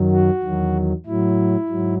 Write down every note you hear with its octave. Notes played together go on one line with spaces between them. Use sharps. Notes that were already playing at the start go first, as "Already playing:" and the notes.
Already playing: F#2 D#3 F#3
F#4
E2 D#3 F#3
A2 F#3 E4
G#2 F#3